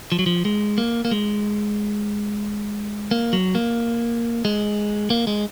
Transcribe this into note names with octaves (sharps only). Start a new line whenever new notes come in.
F3
F#3
F3
G#3
A#3
A#3
G#3
A#3
F#3
A#3
G#3
A#3
G#3